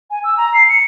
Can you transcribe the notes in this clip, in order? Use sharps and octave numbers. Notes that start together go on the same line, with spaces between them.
G#5
E6
A#5
C7
C#7